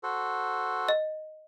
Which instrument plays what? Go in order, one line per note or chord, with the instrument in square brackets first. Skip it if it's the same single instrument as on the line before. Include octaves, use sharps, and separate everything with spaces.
[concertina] F#4 A4 C5
[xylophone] D#5